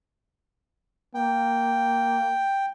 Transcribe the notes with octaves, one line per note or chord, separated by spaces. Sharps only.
A#3 G5